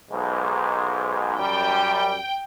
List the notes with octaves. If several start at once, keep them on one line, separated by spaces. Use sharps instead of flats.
B1 G#2
F#2 G3 G5